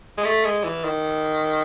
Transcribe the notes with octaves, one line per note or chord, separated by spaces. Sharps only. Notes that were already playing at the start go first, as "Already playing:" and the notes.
G#3
A3
G#3
E3
D#3